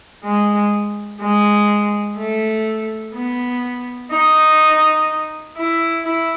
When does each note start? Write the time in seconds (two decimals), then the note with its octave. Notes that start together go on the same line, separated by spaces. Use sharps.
0.24 G#3
1.20 G#3
2.17 A3
3.14 B3
4.11 D#4
5.57 E4
6.05 E4